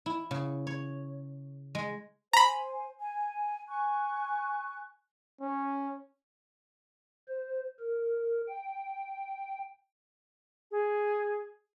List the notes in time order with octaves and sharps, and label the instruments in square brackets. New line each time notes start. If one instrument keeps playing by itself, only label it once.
[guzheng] E4
C#3
C#5
G#3
[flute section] C5 G#5 [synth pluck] A#5 B5
[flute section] G#5
G#5 C#6 F#6
[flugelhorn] C#4
[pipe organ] C5
A#4
G5
[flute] G#4